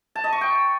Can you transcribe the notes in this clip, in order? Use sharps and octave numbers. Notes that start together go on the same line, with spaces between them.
A5
D#5
C#6
G5